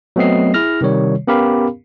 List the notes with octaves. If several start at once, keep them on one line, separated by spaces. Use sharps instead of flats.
F#3 A3 B3 C4 D#5 C7
E4 G#4 F6 A#6
C3 D#3 G3 C#5
B3 C#4 G4 A#4 F5 B5